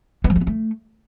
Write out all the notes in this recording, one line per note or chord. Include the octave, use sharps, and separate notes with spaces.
B3
F3
A3
B3
A3